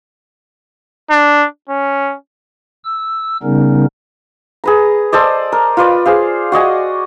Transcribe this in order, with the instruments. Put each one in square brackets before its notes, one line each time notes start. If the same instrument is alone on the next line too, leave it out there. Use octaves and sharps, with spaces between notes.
[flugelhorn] D4
C#4
[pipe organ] E6
C#3 G3 B3 C#4 D#4 A#4
[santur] G#4 B4 A#5
A4 C5 D5 D#5
A#4
F4 B4 D5
G#4 C5 F5
F#4 D5 D#5 G#5